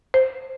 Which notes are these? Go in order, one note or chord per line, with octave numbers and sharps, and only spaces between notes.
C5